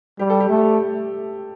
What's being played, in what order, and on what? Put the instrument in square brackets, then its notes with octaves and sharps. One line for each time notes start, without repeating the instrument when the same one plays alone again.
[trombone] G3 [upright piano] G4
[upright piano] A4
G4
[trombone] A3